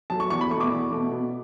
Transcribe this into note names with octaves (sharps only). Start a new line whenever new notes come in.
F#3 A5
A3 C#6
E2 C#6
B5
A3 C#6
B2 D6
E2
B2 A3
B2